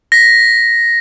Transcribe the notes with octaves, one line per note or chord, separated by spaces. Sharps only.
A#6 B6